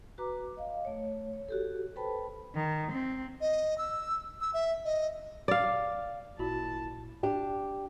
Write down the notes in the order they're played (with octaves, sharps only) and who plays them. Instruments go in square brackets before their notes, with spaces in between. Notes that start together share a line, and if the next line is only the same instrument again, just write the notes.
[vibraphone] F#4 B4 A#5 D6
D#5 F5
A3 C#5
C#5
F#4 G4 A4
A4 B4 C5 G5 A5 B5
[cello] D#3
C4
[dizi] D#5
E6
E6
E5
D#5
[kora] D5 F5
[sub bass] G#1 [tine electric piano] A#2 E4 B5 [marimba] F#4 [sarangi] A5
[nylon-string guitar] D4 G4